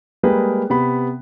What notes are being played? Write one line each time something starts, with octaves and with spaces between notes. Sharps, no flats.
G3 G#3 A#3 G#4 B4 G5
C3 B3 B5